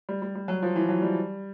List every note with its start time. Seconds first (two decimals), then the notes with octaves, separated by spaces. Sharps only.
0.09 G3
0.22 G3
0.35 G3
0.48 F#3
0.62 F3
0.76 E3
0.89 F#3
1.02 G3